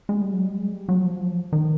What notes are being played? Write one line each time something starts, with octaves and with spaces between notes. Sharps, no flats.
G#3
G3
F#3
G3
G#3
G3
F#3
F3
D#3